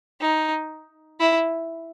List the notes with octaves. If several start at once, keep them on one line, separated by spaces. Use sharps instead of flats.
D#4
E4